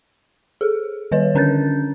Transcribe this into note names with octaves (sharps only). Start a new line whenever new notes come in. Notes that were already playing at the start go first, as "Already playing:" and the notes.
G#4 A4
D#3 G3 B4 C#5
D3 C#4 D4 A#4 G6 A6